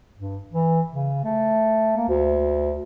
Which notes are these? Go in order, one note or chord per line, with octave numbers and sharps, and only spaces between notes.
G2
E3
C#3
A3
A#3
D2